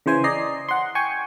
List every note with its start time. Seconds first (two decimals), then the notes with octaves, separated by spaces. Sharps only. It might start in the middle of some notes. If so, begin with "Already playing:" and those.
0.06 C#3 E3 C5 G#5
0.24 D5 D#5 A#5 C7
0.68 F#5 C6
0.95 G5 G#5 C#6